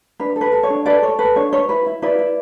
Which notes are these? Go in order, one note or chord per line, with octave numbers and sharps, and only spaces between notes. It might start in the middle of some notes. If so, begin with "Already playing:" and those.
D4 B4
A4
B4
A4
C#5
D4
A4 B4 D5
A4 C#5
A4 B4
D4 C#5
B4 C#5
E4 B4
E4
E4 B4 D5
E4